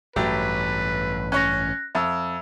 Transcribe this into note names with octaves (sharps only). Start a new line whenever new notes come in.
A1 G2 F#3 A3 G4 B4
C#4 C#5 F#6 A#6
F2 E5 E6